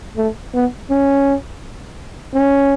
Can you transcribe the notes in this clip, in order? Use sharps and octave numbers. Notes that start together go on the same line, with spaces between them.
A3
B3
C#4
C#4